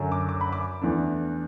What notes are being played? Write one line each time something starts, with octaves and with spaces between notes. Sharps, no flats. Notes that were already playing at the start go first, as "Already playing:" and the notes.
Already playing: F#2 D3 F#3
D6
D6
B5
D6
E2 E3 A3 D4